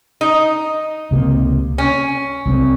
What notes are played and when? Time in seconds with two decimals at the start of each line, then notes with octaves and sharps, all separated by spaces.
0.21 D#4
1.11 C#2 C3 F#3 A#3
1.78 C#4
2.46 C2 C3 F3 C4